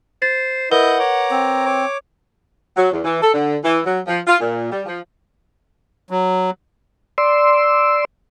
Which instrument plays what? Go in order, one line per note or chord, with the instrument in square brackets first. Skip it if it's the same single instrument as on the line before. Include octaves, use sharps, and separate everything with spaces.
[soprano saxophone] C5 [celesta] A6
[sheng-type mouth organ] E4 D#5 G6 [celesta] A#4 B4 G7 [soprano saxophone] F#5
[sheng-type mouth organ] C#5 A#5 D6
[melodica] C4
[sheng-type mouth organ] C#5 D6
[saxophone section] F#3
E2
E3
A4
D3
E3
F#3
F3
F4
A#2
G3
F3
[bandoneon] F#3
[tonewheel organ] D5 C6 E6